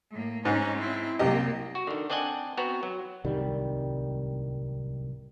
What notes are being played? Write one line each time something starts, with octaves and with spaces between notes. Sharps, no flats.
A2 A#3
G#2 C#4 D#4
C4 E4
C2 F#2 A#3 G4 D#5
F#4
D3 D#3
C4 D4 D5 D#5 F#5 G#5
B3 C4 F#4 A#5
F#3
D1 C2 D#3 G3